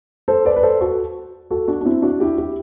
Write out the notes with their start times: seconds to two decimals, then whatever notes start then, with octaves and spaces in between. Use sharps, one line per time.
0.28 A4 C5
0.45 B4 D5
0.56 B4
0.63 A4 C5
0.81 F#4 A4
1.51 F#4 A4
1.68 D4 F#4
1.81 D4
1.85 C4 E4
2.02 D4 F#4
2.20 E4 G4
2.38 E4 G4